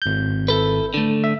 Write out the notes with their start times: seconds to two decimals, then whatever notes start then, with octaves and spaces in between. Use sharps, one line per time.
0.02 G#1 G6
0.48 E4 A4 B4
0.94 D3 A3
1.24 E5